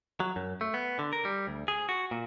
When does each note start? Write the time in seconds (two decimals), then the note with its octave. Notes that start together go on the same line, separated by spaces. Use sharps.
0.20 F#3
0.36 F#2
0.61 A3
0.74 B3
0.99 D3
1.13 A#4
1.25 G3
1.47 D2
1.68 G#4
1.89 F#4
2.11 A#2